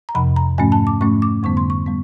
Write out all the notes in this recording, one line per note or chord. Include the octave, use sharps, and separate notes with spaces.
A#5
F2 C3 F3 B5
A#5
G#2 F3 A3 C#4 G#5
A5
D6
G#2 F3 A3 C#4 C#6
D6
F2 D3 G3 B3 C#6
C6
C#6
G3 B3